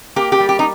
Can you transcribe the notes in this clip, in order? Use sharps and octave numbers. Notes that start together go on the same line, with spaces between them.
A#3 G4
G4
G3
G4
D#4